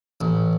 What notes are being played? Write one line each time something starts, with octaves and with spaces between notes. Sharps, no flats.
A1